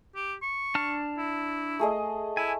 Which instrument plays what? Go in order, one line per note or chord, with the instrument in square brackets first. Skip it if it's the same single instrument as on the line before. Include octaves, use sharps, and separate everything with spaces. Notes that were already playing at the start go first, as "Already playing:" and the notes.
[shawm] G4
C#6
[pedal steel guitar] D4 A5 F6
[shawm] E4
[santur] A3 G#4 D#5
[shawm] E4 [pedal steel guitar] G#5